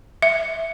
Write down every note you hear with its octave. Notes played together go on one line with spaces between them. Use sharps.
E5